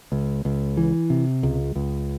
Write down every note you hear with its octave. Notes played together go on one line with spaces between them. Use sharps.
C#2
C#2
E3
C3
C#2
C#2